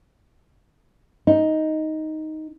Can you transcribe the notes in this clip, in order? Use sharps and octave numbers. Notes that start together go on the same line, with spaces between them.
D#4